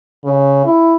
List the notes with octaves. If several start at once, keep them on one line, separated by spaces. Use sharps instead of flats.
C#3
E4